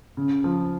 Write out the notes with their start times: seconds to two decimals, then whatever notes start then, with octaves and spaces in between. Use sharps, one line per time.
0.17 C#3
0.44 F3